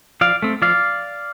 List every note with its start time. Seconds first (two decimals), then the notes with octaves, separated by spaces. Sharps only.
0.21 F3 D5 F5
0.42 A3 C4
0.62 F3 D5 F5